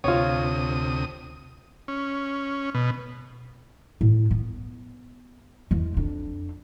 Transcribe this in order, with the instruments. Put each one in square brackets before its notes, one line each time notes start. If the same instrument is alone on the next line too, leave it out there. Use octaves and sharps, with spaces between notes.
[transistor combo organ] D2 C3 D#6 [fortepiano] F4 C#5
[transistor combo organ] C#4
B2
[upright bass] A2
B3
E2 G#3
F2 D4